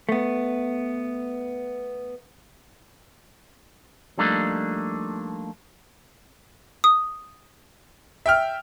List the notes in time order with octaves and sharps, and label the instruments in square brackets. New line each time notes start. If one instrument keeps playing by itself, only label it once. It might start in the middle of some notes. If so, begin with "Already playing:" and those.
[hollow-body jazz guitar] A3 B3
[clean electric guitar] F3 G3 A3 A#3 D4 D#4
[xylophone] D#6
[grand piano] E5 G5 F6